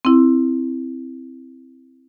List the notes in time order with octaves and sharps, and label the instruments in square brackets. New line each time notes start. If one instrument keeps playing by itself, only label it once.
[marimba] C4 E4